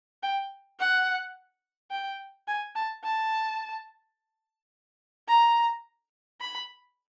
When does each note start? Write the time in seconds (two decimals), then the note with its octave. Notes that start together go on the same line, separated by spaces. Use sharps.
0.23 G5
0.79 F#5
1.91 G5
2.48 G#5
2.75 A5
3.04 A5
5.28 A#5
6.41 B5